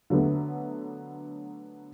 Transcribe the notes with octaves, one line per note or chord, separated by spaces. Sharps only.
D3 F#3 A3 B3